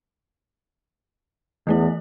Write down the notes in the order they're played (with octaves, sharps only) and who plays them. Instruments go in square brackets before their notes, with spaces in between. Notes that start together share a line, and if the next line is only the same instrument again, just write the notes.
[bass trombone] E2 [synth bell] E3 A3 E4